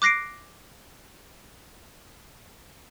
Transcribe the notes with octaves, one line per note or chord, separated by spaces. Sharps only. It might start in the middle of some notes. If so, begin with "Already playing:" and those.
D6 F#6 A#6 C7 D7